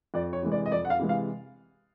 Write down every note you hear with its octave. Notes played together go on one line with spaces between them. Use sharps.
F2 D5
C#5
C3 E3 G#3
D5
D#5
F2 D5
F#5
F5
C3 E3 G#3
F5